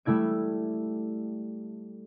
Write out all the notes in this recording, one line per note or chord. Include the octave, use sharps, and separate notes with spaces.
G3 A3 E4 G#6 D7